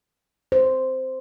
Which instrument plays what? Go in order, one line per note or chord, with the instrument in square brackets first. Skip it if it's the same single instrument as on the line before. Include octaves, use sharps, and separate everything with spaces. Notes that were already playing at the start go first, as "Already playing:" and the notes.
[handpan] C5